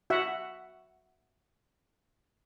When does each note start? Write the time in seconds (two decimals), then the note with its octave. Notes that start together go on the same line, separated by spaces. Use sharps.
0.10 F#4 E5 F#5